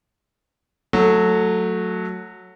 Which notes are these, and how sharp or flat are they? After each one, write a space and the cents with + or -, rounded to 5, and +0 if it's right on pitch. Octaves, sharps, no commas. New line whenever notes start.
F#3 -10 A3 +5